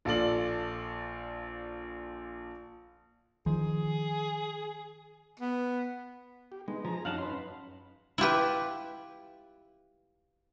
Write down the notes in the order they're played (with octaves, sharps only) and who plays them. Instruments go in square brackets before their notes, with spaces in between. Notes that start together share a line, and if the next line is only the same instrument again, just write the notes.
[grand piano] A#1 F4 A4 D5 F#7
[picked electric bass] D#3 F3 [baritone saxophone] G#4
[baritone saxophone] B3
[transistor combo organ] G4
[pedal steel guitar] G#3 [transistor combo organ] B3 D#4
[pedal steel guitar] F3 [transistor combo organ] G#4 A#5
[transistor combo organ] F#2 C#4 D#4 [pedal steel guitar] F5 F#5 A5
[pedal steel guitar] B4 C6
[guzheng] E4 F4 G4 B4